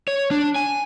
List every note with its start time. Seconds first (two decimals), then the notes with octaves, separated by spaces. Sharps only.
0.08 C#5
0.31 D4
0.56 G#5